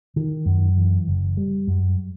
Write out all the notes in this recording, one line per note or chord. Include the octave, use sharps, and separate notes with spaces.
D#3
F#2
E3
F#1
G3
F#2